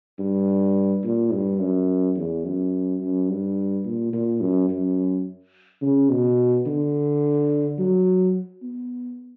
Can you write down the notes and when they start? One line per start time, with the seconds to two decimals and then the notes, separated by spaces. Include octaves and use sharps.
0.19 G2
1.04 A#2
1.32 G2
1.59 F#2
2.16 E2
2.45 F#2
3.01 F#2
3.29 G2
3.85 A#2
4.13 A#2
4.41 F#2
4.69 F#2
5.82 C#3
6.09 B2
6.67 D3
7.79 F#3
8.62 B3